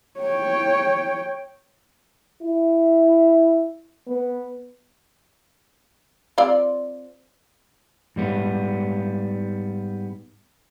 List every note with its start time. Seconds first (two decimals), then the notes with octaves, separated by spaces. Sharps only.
0.19 C#5 G5
2.42 E4
4.08 B3
6.38 C4 F4 D5
8.16 G#2 G3 B3